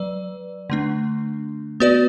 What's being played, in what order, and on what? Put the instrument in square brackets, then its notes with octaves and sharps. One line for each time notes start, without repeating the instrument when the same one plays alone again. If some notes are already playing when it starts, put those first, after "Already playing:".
Already playing: [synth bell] F#3 B4 D5
D3 A3 D4
B3 F#4 B4 D5